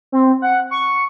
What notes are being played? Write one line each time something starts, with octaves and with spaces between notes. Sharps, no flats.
C4
F#5
C#6